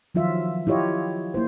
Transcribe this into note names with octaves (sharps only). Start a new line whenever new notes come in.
D#3 F3 F#3 F4 E5
E4 F4 G4 C#5 D#5
A#3 E4 C5